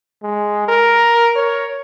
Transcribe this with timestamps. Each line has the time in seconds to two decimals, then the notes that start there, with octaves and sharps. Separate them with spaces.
0.23 G#3
0.68 A#4
1.36 C#5